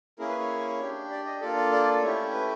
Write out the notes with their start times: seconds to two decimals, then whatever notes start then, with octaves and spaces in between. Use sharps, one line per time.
0.19 A#3 C#4 E4 G#4 A#4
0.29 B4
0.39 C#5
0.80 D4 G4
1.10 D5
1.26 D#5
1.41 A#3 D4 F4 A4 D5
1.57 D5
1.72 D5
2.02 A3 C#4 E4 G4 C#5
2.33 B4